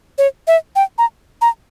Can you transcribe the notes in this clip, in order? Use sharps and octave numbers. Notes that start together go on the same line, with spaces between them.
C#5
E5
G5
A#5
A#5